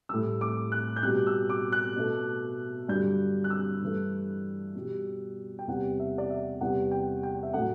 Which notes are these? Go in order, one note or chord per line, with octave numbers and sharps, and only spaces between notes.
A2 G3 E6
D6
F#6
G6
B2 G3 F#6
E6
D6
F#6
B2 A3
G2 D3 F#3 G6
F#6
E6
G2 E3 A3
B2 G3
G5
E2 C3 G3 F#5
E5
D5
E5
E2 C3 G3 F#5
G5
G5
E5
A2 F#3 A3 F#5